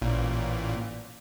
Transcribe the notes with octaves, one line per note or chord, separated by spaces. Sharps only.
A1 A#2